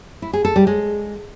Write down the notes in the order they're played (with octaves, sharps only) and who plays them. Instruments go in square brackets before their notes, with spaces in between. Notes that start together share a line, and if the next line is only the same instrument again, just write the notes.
[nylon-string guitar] E4
G#4
A4
G3
G#3